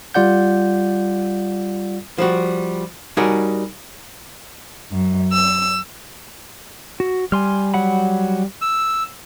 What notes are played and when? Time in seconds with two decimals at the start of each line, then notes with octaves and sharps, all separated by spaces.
0.14 G3 F4 D5 F#5 G6
2.18 F3 G3 F#4
3.17 G3 D#4 F#4 G#4 A#4 C#5
4.92 F#2
5.32 E6
7.00 F#4
7.32 G3 G#5 C6 F6
7.74 F#3 F#5 B5
8.62 E6